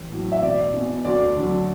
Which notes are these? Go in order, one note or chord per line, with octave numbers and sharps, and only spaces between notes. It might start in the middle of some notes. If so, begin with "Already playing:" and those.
Already playing: A1
A2 F#3
E5
E1 D5
E2 B2
D2 D5
D3 F#3